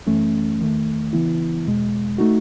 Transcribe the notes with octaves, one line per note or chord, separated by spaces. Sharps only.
F#2 E3 A3 C#4
E2 D#3 A3
C#3 E3 B3 E4
E2 B2 G#3
A3 D#4 F#4